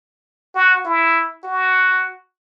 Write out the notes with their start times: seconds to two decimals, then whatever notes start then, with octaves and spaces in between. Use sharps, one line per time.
0.55 F#4
0.85 E4
1.44 F#4